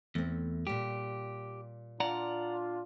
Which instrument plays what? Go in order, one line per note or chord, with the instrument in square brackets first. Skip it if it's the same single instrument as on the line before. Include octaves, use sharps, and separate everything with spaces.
[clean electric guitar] E2 [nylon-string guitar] A3 C4
[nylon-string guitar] A#2 G3 [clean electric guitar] G4
[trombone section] D4 F4 [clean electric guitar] D5 F#5 A#5